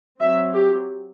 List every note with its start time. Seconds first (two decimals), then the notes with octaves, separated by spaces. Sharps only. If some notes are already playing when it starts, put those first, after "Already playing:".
0.21 F#3 C4 E5
0.54 G4